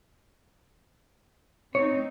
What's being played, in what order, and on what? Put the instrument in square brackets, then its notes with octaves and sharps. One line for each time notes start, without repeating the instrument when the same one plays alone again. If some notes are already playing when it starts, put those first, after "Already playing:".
[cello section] C4 D#4 [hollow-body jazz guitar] C#5